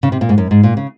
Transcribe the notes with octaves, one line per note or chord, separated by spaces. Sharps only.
C#3
C3
A#2
G#2
F#2
G#2
A#2
C#3